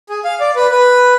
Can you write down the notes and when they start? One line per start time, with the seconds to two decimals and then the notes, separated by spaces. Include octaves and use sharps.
0.09 G#4
0.25 F5
0.40 D5
0.56 B4
0.71 B4